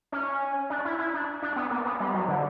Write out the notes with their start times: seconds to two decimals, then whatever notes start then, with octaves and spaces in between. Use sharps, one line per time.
0.12 C#4
0.70 D4
0.85 E4
0.99 E4
1.14 D4
1.42 D4
1.56 B3
1.71 A#3
1.85 B3
2.00 G3
2.14 F#3
2.28 D3